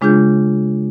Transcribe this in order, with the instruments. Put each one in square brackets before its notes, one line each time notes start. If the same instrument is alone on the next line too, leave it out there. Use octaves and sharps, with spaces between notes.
[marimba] C#3 G#3 D4 F4 G#4 G6